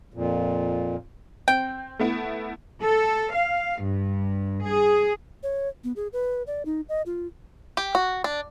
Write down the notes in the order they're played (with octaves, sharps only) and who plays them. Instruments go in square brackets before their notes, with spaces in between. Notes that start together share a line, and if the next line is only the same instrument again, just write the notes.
[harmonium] F2 A#2
[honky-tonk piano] C4 [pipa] G5
[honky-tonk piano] A3 B3 E4
[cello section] A4
F5
G2
G#4
[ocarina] C#5
B3
G#4
B4
D5
D#4
D#5
F4
[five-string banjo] G4
F#4
D4